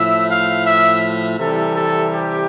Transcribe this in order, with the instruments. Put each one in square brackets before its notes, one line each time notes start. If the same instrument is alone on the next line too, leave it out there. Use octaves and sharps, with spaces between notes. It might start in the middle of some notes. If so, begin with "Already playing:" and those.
Already playing: [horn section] A2 F3 E5
F5
E5
C3 E3 G3 A4
A4
G4